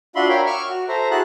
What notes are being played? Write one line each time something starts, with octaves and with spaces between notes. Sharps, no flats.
D4 F4 F#4 E5 B5 C6
A#4 C#5 E5 F5 G5
C#6 D6 E6 F6
F#4
A4 C5 E5 A#5
E4 F#4 G#4 A5 F#6